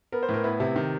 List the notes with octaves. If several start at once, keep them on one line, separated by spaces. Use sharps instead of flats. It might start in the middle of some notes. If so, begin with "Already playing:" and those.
B3 A#4
C5
A2
A#4
B3 E4
C3 E4
D#3